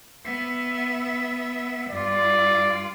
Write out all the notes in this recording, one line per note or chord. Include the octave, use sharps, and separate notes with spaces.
B3 E5
G2 F4 D5